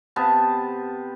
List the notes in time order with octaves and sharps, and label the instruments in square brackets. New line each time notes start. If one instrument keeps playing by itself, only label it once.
[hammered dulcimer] C3 B3 A5